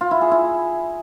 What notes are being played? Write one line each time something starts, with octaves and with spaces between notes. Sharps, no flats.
F4
E4
G#4
E4